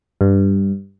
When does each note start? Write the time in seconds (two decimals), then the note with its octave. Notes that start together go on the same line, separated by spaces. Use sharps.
0.21 G2